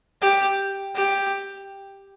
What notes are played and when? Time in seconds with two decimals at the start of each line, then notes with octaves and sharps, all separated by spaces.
0.21 G4
0.95 G4